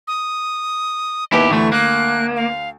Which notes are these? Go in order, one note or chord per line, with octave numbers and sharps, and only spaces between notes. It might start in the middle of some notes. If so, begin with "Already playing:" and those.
D#6
D#2 B3 E4 G4 E5
D2 E3 A3 C#6
A#3 F#6
F5